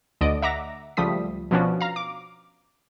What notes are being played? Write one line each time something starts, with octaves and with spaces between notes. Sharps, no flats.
D2 D3 D5 D#5 D7
E5 F#5 A#5 D6 A#6
C#2 F3 G3 A3 D#6 B6
B2 F3 B3 C#4 D4 F#4
F5 A#5
D6